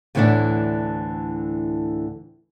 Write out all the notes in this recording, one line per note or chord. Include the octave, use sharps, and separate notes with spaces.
D2 A2 D3 E3 B3 D4